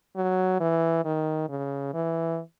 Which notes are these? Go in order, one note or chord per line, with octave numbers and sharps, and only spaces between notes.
F#3
E3
D#3
C#3
E3